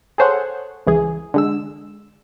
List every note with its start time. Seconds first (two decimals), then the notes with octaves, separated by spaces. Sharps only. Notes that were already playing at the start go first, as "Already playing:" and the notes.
0.18 G#4 A4 C5 C#5 F#5
0.87 C#2 E3 G#4
1.34 D3 G#3 E6